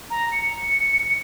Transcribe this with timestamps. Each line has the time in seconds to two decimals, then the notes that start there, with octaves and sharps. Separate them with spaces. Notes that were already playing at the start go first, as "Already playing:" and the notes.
0.10 A#5
0.32 C#7